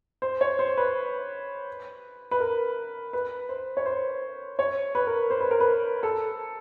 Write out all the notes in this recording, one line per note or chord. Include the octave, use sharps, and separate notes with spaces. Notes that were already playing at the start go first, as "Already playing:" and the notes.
C5
C#5
C5
B4
B4
A#4
B4
C5
C#5
C5
C#5
B4
A#4
C5
B4
A#4
B4
A4